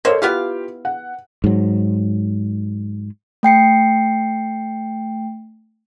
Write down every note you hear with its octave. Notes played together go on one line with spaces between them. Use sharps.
A#3 A4 C5 C#5 D#5
B3 E4 F4 G4 F5
F#5
G#2 F#3
A3 G5 C7 C#7